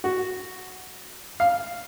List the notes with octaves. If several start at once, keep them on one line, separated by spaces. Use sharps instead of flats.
F#4
F5